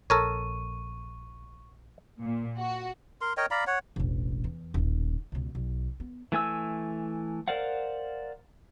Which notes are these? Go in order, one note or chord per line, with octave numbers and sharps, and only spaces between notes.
A#1 A4 A#4 C#5 C#6 D#7
A#2
F#4
A#4 C6
A#4 C#5 D#5 G5
D5 F5 A#5 B5
C#5 F#5
E1 A1
E2
D#1 A1
C#2 B2
B1
B3
E3 A3 G#5 E6
A#4 C5 D5 F5 F#5